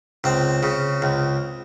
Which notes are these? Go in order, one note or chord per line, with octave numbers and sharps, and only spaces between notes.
C#2 C4
C#3
C#2